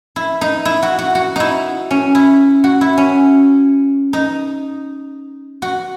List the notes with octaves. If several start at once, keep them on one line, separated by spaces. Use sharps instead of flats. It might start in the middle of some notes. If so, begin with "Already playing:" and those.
E4
D#4
E4
F#4
F#4
F#4
D#4 E4
C#4
E4
F#4
E4
C#4
D#4
F#4